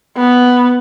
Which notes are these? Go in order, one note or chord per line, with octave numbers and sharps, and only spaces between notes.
B3